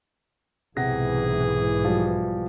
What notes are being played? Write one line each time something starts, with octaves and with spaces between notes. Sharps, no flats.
B1 G#2 C3 E3 G#4 F#5 A#6
F3 G3 F#4